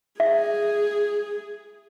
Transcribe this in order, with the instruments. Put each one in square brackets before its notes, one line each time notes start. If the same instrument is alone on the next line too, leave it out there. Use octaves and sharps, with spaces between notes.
[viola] G#4 [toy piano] E5